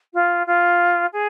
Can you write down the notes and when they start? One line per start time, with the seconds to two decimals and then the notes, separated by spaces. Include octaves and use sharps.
0.13 F4
0.46 F4
1.12 G#4